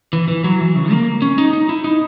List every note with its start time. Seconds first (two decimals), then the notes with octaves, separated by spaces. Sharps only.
0.13 E3
0.28 E3
0.44 F#3
0.60 E3
0.76 C#3
0.91 A#3
1.22 C#4
1.38 D#4
1.53 D#4
1.69 E4
1.84 D#4